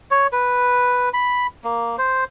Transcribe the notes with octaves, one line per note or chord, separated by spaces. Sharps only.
C#5
B4
B5
A#3
C5